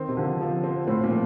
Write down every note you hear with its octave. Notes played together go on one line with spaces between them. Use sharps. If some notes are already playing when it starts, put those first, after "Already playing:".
Already playing: D#3 C4
C3
D3 F3
F3
C4
A2 C4
A#2
F3